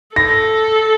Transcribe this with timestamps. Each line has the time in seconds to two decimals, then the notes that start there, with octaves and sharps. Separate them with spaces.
0.16 A4 A#6